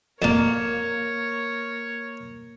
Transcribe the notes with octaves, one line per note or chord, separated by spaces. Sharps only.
F2 A#2 A#3 A#4 C#5 A5